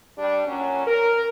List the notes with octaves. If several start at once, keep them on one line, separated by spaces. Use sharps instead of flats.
G3 D4
A#2 F#3 C#4
A#4